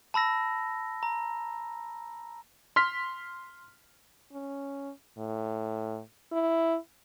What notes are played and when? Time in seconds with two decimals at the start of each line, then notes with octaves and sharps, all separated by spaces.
0.14 A5 B5 E6 A#6
1.03 A#5
2.76 C6 F6 B6
4.33 C#4
5.18 A2
6.32 E4